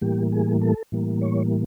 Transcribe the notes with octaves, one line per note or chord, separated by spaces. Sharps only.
A2 E3 G3 A#3 G4
G#4
A4
A2 E3 G3 A#3
C#5